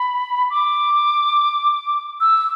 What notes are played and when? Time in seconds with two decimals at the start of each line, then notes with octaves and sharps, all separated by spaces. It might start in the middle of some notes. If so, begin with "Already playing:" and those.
Already playing: B5
0.50 D6
2.21 E6